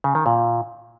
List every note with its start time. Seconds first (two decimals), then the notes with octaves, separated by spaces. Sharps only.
0.04 C#3
0.15 D#3
0.26 A#2